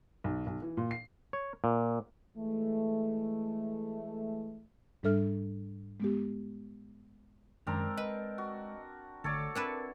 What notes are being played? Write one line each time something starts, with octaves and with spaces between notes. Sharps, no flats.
B1
B1
E3
A#2
C7
C#5
A#2
E3 G#3 A3
G#2 G3 D4 A4 E5 F6
G#3 B3 G4
F#2 D#3 G#3 C4 D4 A#4 A#5
B4 D#5
F#4
G#1 D3 A3 A4 C#5 D5
C4 D4 E4 A#4 B4 G5